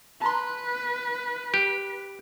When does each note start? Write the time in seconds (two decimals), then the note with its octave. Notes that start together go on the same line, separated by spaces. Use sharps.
0.22 B4 A5 A#5 C6
1.54 G4